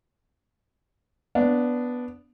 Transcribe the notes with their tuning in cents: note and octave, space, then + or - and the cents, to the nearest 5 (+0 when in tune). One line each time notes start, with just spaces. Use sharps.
B3 +0 D4 -10 F5 +25